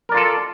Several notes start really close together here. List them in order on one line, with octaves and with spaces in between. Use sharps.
A#4 D5 F4 A4